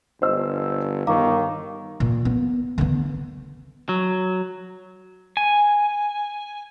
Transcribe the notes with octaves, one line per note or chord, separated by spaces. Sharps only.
G1 C5 D#5 E6
G1 D#3 F5 A#5 C#6 D6
A#2
B3
D3 B3
F#3
G#5